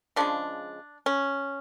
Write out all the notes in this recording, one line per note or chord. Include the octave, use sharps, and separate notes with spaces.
C#3 F3 G#3 D4
C#4